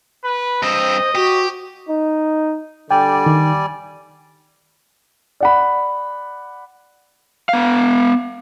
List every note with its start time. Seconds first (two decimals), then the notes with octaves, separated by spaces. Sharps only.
0.24 B4
0.63 G2 C4 C5 D#5
1.15 F#4 G4
1.89 D#4
2.91 D3 G3 D5 G5 G#5
3.26 D#3
5.40 D5 F#5 B5
7.49 B3 F5